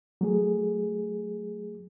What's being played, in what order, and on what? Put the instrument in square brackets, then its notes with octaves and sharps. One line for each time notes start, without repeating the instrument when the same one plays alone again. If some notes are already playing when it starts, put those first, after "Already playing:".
[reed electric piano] F#3 A3 G#4